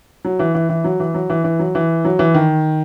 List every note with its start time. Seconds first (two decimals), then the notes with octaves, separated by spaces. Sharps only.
0.25 F#3
0.39 E3
0.55 E3
0.69 E3
0.84 F#3
1.00 E3
1.14 F#3
1.30 E3
1.44 E3
1.59 F#3
1.75 E3
2.05 F#3
2.19 E3
2.35 D#3